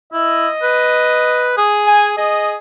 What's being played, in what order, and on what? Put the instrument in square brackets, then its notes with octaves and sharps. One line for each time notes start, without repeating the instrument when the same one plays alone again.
[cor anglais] E4 [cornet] D#5
[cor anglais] B4
G#4
[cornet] G#5
[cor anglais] G#4 [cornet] D#5